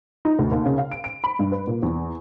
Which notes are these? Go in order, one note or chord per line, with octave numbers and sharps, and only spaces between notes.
D#4
D2
D#2
C#3
F5
D7
D7
B5
G2
B4
A#2
E2